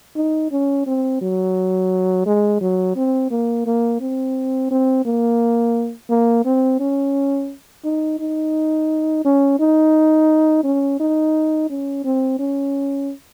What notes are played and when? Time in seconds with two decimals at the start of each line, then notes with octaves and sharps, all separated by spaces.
0.16 D#4
0.51 C#4
0.87 C4
1.21 F#3
2.26 G#3
2.61 F#3
2.96 C4
3.31 A#3
3.66 A#3
4.01 C4
4.71 C4
5.05 A#3
6.10 A#3
6.45 C4
6.80 C#4
7.85 D#4
8.20 D#4
9.25 C#4
9.59 D#4
10.64 C#4
11.00 D#4
11.70 C#4
12.04 C4
12.39 C#4